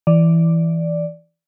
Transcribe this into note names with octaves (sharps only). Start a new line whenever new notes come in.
E3 D5